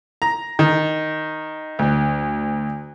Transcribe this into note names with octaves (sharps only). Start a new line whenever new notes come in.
A#5
D#3
D2